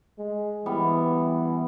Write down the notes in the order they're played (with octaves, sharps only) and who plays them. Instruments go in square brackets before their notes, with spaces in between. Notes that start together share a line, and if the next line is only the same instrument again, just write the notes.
[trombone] G#3
[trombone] E3 [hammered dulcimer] G3 B3